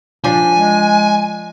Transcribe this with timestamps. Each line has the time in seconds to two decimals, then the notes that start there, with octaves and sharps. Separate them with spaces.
0.24 F3 D4 G#5
0.55 G#3